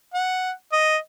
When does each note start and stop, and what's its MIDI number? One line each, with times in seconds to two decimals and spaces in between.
0.14 0.51 78
0.73 0.97 75